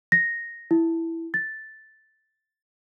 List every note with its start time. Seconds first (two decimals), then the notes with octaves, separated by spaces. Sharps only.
0.12 A#6
0.71 E4
1.34 A6